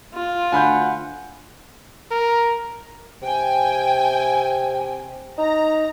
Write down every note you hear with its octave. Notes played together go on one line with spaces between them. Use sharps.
F4
D2 F#5 G#5 B5 G6
A#4
C3 G5 G#5
D#4 A#5